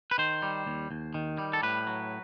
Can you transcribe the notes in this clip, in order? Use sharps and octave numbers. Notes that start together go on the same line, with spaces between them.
B4
D#3 C5
G3
D#2
D#2
D#3
G3
A4
A2 B4
F#3